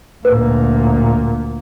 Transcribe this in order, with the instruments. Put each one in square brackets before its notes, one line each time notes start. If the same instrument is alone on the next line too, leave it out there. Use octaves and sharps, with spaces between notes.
[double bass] D2 A#2 [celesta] B4